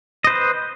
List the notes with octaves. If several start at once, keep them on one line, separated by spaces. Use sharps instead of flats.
B4 C5 D#5